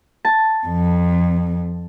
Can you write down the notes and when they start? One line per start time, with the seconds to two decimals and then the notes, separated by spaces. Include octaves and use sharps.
0.25 A5
0.67 F2